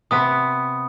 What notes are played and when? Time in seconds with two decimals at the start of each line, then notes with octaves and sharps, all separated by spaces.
0.11 C3 B3 D#6